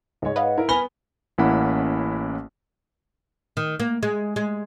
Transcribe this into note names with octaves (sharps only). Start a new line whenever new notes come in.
C#2 G#2 G#3 C#5
B4 D#5 F5 F#5
E4 A#4
B3 G#5 B5 F6 A#6 G7
A1 A#3 C#4 E4 F#5 B5
D#3
A#3
G#3
G#3